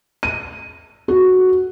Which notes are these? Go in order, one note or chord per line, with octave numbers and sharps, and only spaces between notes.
D#7
F#4